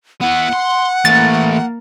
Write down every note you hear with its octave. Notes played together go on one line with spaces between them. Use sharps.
B3 E4 F#5
C6
E3 A3 A#3 A6